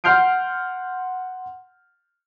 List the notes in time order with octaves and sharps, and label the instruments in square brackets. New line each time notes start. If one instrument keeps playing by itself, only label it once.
[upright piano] F#5 C6 F6 G6 C7 D7